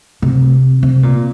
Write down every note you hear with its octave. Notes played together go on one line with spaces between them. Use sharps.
C3
C3
A#2